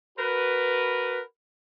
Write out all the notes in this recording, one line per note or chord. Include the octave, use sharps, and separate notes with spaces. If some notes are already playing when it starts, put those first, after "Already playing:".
F#4 A#4 B4